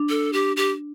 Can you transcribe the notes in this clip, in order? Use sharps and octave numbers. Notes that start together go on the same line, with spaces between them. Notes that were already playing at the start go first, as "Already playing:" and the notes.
Already playing: D4
A4
G4
G4